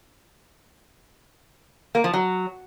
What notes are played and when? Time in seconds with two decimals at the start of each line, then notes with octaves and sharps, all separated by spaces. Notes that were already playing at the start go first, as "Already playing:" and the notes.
1.95 A#3
2.04 F3
2.14 F#3